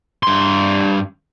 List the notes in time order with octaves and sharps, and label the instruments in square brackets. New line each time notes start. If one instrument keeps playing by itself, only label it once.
[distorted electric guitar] G2 C6